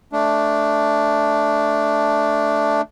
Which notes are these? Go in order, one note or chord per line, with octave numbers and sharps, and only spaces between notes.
A3 D4